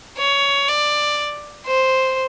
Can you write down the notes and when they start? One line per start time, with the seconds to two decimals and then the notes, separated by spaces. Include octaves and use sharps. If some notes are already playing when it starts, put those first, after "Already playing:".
0.18 C#5
0.68 D5
1.67 C5